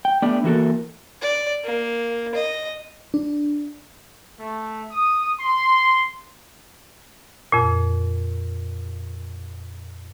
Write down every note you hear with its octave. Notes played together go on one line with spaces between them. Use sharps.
G5
A3 B3 D4 G4 D5
E3 A#3 F#4 A4 A#4
D5
A#3
D#5
D4
A3
D#6
C6
F2 A#2